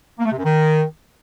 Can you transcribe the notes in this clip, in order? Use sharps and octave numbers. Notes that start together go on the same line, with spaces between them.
A#3
A3
C3
F#2
D#3